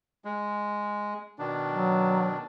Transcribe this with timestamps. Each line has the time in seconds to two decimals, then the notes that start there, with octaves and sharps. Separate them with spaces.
0.25 G#3
1.39 B2 D#3 D4
1.71 F#3